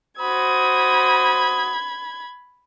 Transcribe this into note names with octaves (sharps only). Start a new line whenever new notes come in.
F#4 C5 B5 D#6 G#6